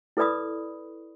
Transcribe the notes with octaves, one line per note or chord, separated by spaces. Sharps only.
E4 A4 B4 D5 B5 D#6